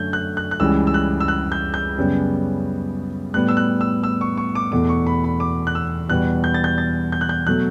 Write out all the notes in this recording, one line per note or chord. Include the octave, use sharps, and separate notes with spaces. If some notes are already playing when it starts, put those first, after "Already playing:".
Already playing: F#2 D3 A3 G6
F#6
F#6
F#6
C#2 C#3 E3 G3 E6
E6
F#6
E6
F#6
G6
G6
F#2 C#3 G3 B3
A2 G3 B3 F#6
E6
F#6
E6
E6
C#6
C#6
D6
E2 B2 A3 D6
C#6
B5
B5
D6
F#6
E6
E2 B2 G3 B3 F#6
G6
A6
G6
A6
G6
F#6
G6
B2 F#3 A3 F#6